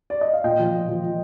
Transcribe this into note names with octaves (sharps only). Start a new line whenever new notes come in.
D5
D#5
F5
A#2 D#5 G5
F3
A#2
F3
F3